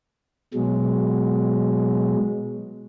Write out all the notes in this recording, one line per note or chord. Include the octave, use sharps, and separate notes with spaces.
B2 F#3 G#3